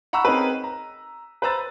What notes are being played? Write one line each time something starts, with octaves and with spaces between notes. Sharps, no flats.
F#5 A#5 B5 C#6 E6
C4 C#4 D#4 G#4 A#4 B4
A#5
B4 C5 A#5 E6 A6